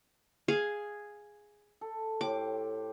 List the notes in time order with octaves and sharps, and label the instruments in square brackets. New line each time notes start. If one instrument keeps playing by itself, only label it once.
[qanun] G#4 F5
[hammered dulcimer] A4
[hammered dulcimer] A2 G4 C5 [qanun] D6